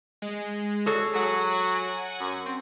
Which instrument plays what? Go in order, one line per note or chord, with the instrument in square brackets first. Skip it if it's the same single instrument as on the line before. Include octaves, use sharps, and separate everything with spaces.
[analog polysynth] G#3
[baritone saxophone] F#4 [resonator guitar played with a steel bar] G#4 A4 C#5
[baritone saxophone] F#3 [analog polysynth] F#5 G#5
[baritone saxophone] F#2
C4